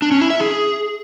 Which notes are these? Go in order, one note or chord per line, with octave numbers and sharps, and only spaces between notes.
D4
C#4
E4
E5
G#4